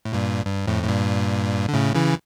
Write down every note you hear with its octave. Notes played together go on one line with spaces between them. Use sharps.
A2
G2 A#2
G2
F2 A2
A2
G2 A#2
D3
A2 C#3
C#3 E3